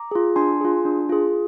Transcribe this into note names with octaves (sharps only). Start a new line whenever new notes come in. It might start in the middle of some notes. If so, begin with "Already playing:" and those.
Already playing: A#5 D6
F4 G#4
D4 G#5 C6
F4 G#4
D4
F4 G#4